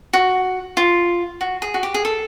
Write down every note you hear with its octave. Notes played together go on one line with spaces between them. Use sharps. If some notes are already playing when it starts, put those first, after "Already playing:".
F#4
F4
F#4
G#4
F#4
G4
G#4
A4